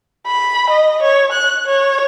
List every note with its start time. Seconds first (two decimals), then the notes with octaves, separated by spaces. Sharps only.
0.26 B5
0.70 D#5
1.02 C#5
1.32 F#6
1.66 C#5